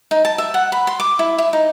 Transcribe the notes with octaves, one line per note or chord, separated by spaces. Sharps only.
D#4
A5
E5
F#5
B5
C6
D6
E4
E4
D#4